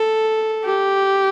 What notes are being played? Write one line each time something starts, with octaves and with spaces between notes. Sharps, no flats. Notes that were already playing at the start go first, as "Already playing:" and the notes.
Already playing: A4
G4